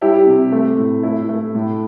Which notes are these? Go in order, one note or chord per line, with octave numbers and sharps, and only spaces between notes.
G3 E4 G4
C3
A3
A2
A3 E4
A3
A2